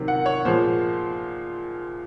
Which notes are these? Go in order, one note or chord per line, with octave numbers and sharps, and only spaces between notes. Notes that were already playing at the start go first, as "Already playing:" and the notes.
Already playing: C3 D#3 F#3
F#5
C#5
A#2 F3 G#3 C5